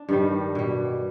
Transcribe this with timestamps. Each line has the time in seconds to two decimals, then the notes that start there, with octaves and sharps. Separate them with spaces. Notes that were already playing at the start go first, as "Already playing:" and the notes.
Already playing: D4
0.09 G2 D#3 G3
0.55 B2 G3